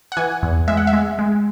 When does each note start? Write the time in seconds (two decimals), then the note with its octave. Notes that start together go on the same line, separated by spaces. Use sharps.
0.12 F#5
0.17 E3 G#5
0.43 E2
0.68 G#3 E5
0.77 F#5
0.87 E5
0.93 G#3
1.19 G#3